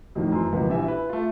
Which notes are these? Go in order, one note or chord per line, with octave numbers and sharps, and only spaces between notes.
F2 A2 D#3 F3
F#2 E3 C6
C#2 B2 E3 F3 A#3 B3
A#1 E3 G3 E5 F5 G#5
E4 B4
A3 F4